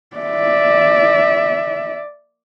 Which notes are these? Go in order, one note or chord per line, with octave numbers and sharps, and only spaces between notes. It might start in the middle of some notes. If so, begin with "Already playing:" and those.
D5 E5